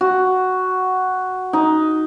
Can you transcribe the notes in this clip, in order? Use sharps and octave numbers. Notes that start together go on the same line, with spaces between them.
F#4
D#4